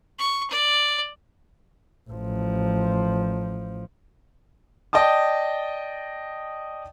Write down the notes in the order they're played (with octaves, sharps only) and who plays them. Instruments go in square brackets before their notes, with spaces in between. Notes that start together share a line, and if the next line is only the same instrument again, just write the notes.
[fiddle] C#6
D5
[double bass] A1 F3
[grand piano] D5 D#5 G5 A5 D#6